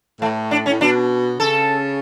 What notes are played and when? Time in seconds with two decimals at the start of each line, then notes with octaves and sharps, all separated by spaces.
0.21 A2 A3
0.51 D4
0.66 C#4
0.69 A2
0.81 B2 D4
1.40 C#3 A4